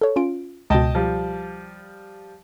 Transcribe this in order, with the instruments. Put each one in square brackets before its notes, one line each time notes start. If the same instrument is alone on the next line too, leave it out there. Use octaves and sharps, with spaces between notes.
[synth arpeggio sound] A4 C#5
C#4 F4 D7
[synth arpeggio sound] C#2 B2 [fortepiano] D#5 G5 A5
[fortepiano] F3 G3